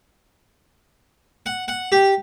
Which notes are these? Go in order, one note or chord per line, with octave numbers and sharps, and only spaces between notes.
F#5
F#5
G4